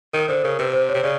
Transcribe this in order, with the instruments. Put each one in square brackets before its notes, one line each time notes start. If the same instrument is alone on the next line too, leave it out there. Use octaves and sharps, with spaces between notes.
[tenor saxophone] D#3 [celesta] A#4
[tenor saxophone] D3 [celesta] C5
[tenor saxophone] C#3 [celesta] A#4
[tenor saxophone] C3 [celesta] B4
[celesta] C5
C#5
[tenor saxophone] C3
[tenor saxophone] C#3 [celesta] D5